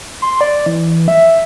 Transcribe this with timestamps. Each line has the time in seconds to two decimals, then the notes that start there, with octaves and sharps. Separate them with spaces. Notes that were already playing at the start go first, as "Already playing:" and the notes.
0.22 C6
0.41 D5
0.66 E3
1.08 E5